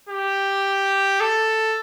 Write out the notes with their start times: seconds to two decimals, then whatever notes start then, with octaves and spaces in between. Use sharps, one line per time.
0.09 G4
1.20 A4